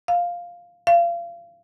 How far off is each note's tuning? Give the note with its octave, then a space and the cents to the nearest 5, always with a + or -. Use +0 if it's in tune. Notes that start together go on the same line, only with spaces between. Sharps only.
F5 +5
F5 -30